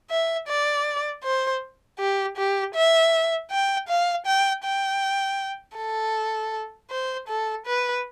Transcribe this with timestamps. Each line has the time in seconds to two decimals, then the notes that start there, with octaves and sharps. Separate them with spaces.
0.10 E5
0.48 D5
1.24 C5
1.99 G4
2.37 G4
2.75 E5
3.51 G5
3.88 F5
4.26 G5
4.64 G5
5.77 A4
6.90 C5
7.28 A4
7.66 B4